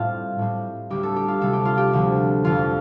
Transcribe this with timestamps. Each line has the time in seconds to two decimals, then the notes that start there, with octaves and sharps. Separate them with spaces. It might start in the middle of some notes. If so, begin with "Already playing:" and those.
Already playing: A2 G3 C4 F4
0.39 A2 G3 C4
0.90 D2 D3 G3 C4 G4
1.03 A4
1.16 G4
1.28 F4
1.41 D2 C3 G3 C4 A4
1.53 G4
1.65 F4
1.78 G4
1.93 D2 D3 F3 C4
2.44 F2 D3 F3 F4